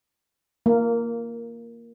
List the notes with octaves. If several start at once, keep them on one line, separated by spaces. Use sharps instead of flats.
A#3